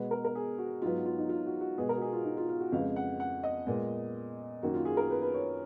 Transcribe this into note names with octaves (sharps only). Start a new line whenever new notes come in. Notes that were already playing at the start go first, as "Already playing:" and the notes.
Already playing: B2 G#3 B3 B4
A#4
A#4
G#4
F#4
G#2 F#3 B3 F4
F4
D#4
F4
F#4
F#4
B2 G#3 B3 G#4
A#4
F#4
G#4
F4
D#4
F4
F4
F#4
F2 C#3 G#3 B3 F5
F#5
F#5
D#5
A#2 G#3 B3
F#2 D#3 A#3 F#4
F4
G#4
A#4
B4
B4
C#5